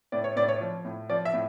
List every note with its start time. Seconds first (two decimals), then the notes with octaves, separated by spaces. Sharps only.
0.12 A2 D5
0.24 C#5
0.36 A2 D5
0.48 C#5
0.61 F3
0.85 A2
1.09 F3 D5
1.25 E5
1.34 A2